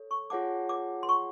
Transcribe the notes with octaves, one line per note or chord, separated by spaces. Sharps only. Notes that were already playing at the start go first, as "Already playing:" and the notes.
Already playing: A4 C#5
C#6
F4 G#4 C#5 F#5 A5 D6
D6
C6
C#6